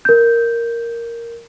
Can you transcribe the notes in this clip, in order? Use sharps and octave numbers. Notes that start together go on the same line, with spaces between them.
A#4 G6